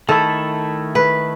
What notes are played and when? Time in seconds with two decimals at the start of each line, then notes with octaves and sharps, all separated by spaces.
0.09 D#3 A3 E4 A4
0.95 B4